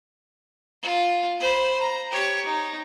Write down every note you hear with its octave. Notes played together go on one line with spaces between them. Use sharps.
F4
C5 B5
A#5
G4 C#5
D#4